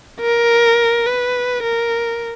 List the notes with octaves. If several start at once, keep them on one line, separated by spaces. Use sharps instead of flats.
A#4
B4
A#4